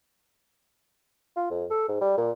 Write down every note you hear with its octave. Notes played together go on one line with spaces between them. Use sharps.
F4
F2
A4
G#2
G3
A#2